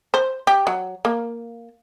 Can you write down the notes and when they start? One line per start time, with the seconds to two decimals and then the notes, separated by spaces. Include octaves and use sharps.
0.14 C5
0.47 G4
0.67 F#3
1.05 A#3